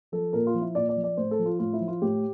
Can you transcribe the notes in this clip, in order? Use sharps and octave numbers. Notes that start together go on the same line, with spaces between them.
F3 A4
A#2 A#4
F4
F3
E4
A#2 D5
D5
F3
D5
A2 C5
A4
F3
F4
A2 F4
E4
F3
F4
A2 G4